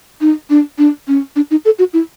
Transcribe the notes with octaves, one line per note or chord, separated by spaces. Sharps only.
D#4
D4
D4
C#4
D4
D#4
A4
F#4
E4